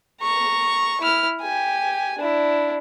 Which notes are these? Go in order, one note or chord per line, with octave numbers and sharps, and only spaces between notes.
A#5 C#6
E4 F6
G4 G#5
D4 E4